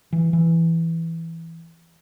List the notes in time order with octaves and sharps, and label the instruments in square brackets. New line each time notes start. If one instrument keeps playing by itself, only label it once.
[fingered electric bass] E3
E3